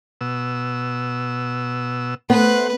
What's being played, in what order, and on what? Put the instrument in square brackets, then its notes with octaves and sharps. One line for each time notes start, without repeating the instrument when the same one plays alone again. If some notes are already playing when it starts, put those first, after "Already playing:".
[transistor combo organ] B2 E6
[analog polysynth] A3 [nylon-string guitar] B3 [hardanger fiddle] B4 [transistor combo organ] C5 F#5